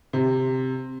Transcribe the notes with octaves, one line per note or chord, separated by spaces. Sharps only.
C3